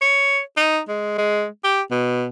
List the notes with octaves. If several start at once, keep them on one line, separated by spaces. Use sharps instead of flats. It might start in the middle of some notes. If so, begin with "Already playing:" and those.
C#5
D#4
G#3
G#3
G4
B2